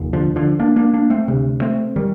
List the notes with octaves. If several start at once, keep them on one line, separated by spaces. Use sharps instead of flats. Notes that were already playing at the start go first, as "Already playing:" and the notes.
Already playing: F1 D#2
D3 F3
D3 F3
A#3 D4
A#3 D4
A#3 D4
A3 C4
D2 C3
A3 C4
D#3 G3